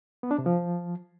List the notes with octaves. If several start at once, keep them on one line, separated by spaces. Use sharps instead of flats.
B3
D4
C3
F3